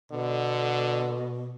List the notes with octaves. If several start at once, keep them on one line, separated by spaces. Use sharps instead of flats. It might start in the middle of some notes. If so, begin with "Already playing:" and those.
B2 D3